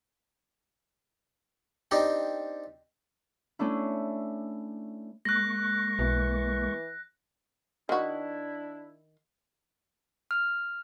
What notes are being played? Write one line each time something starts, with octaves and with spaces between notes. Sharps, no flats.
C4 D4 D#4 G4
A3 C#4 D4 E4
G#3 A#3 C#6 F#6 A#6
B1 E3
D#3 D4 E4 F#4
F6